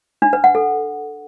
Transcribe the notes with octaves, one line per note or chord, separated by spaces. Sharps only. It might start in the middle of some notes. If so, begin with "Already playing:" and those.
D4
B4
F#5
A4